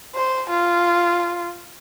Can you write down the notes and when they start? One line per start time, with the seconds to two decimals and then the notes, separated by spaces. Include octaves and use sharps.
0.15 C5
0.50 F4